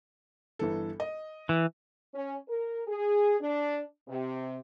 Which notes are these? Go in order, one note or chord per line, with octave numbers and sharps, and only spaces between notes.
G1 E3 A4
D#5
E3
C#4
A#4
G#4
D4
C3